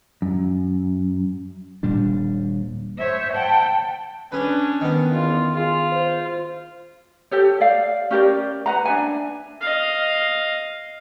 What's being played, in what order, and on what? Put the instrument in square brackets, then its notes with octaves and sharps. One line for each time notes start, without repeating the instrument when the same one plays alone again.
[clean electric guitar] F#2
[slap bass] D#1 A#2 G3 D4
[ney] C5 [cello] C#5 E5
[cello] F#5 G5 [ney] A5
[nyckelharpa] C#4 D4 [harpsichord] G#4 B4
[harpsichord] D#3 B3
[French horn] E2 [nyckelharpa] F4
[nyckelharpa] F4 [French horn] G#4
[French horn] C5
[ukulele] G4 A4 C#5
D5 F5
C#4 G4 A#4 D5
B4 F#5 A#5
D4 E5 G#5
[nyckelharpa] D#5 F5